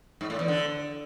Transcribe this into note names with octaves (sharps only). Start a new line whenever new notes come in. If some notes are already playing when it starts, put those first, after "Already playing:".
G#2
A2
E2
D3